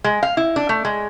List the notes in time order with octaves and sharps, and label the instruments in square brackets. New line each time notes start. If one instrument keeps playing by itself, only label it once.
[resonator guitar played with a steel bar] G#3
F5
E4
D4
A3
G#3